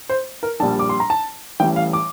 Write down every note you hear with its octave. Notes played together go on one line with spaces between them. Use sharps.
C5
A#4
A#1 A#2 G3 A5
D6
C6
A#5
A5
A1 A2 E3 G3 G5
F5
D6